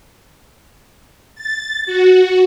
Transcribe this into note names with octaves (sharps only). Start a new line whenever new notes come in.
A6
F#4